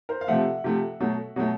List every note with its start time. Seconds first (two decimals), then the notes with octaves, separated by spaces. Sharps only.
0.09 A#4 C5
0.21 F5
0.27 C3 F3 A3 E5 F#5
0.64 C3 F3 A3
1.00 B2 F#3 A3
1.36 B2 F#3 A3